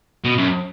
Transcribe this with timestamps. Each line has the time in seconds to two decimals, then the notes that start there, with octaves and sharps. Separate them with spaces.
0.25 B2
0.38 F#2